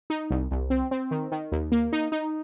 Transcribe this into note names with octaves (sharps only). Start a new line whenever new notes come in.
D#4
C2
C2
C4
C4
D#3
D#3
D#2
A#3
D#4
D#4